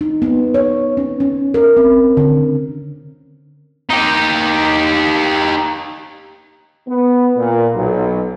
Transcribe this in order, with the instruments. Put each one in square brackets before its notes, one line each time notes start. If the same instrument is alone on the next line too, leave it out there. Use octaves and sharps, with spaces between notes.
[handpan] D#4
B3
C#5
C#4
C#4
A#4
C4
D3
[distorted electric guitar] D#4 G4
[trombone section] B3
A#2
B1